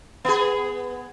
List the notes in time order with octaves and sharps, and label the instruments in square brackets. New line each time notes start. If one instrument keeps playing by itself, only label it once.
[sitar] B3 G#4